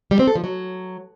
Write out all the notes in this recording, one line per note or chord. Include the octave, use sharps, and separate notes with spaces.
G3
C4
A4
F3
F#3